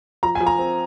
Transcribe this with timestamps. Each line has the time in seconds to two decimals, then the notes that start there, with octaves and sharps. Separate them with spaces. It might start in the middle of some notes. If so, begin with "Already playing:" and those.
0.23 F3 A#5
0.35 G#5
0.41 F3
0.47 A#5
0.59 C4